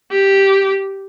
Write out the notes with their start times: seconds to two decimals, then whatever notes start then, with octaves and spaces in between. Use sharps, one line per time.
0.11 G4